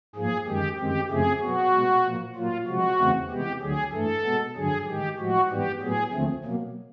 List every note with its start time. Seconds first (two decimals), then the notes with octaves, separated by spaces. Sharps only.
0.15 G#2 F3 A#3 G#4
0.47 F#2 D#3 G#3 G4
0.78 F#2 D#3 G#3 C4 G4
1.10 F#2 C#3 F3 A3 C4 G#4
1.41 B2 F#3 B3 F#4
1.73 B2 G#3 B3
2.04 A#2 F3 A#3
2.35 A#2 F#3 A#3 F4
2.67 C3 F3 G#3 F#4
2.98 E2 C#3 E3 A3 C4
3.30 C3 E3 G#3 B3 G4
3.61 D2 D3 F#3 G#4
3.93 G2 E3 A3 A4
4.24 B2 G#3 B3
4.56 G2 D3 F#3 G#4
4.87 G#2 D#3 G#3 G4
5.18 A2 F3 G#3 F#4
5.49 G#2 E3 G3 B3 G4
5.81 A2 F#3 B3 G#4
6.13 D#2 D3 F3 A3 C4
6.44 B2 F#3 A#3